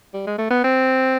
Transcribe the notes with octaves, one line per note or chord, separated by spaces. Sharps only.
G3
G#3
A3
B3
C4